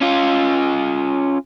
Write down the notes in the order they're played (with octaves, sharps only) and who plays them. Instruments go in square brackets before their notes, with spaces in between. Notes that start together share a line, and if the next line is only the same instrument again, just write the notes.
[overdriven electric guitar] C#4 F4